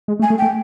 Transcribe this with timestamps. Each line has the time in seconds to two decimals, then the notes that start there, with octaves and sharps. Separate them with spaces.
0.08 G#3
0.20 A3
0.23 G#5
0.30 A3
0.38 G5
0.42 A3